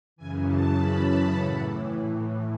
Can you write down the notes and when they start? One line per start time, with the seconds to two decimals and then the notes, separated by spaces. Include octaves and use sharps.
0.16 F#2 C#3 E3 G#5
0.45 A5
0.74 B5
1.03 A5
1.31 A2 E3 F#5